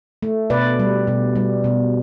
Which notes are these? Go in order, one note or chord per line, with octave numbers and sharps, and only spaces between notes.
A3
B2 B4 D5
G3
B2
G3
B2